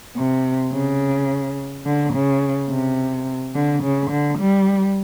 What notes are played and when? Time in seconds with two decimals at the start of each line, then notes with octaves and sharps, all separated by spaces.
0.16 C3
0.73 C#3
1.86 D3
2.13 C#3
2.70 C3
3.55 D3
3.83 C#3
4.11 D3
4.39 G3